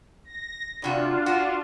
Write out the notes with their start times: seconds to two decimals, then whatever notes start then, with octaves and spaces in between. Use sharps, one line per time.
0.25 A#6
0.82 E2 C3 D4 F4 F#4
1.26 F#4